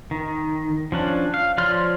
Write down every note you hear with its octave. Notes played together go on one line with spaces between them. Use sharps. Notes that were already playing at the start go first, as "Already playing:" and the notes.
D#3
F3 C#4 D4
F5
F3 C#5 D5 C6 F6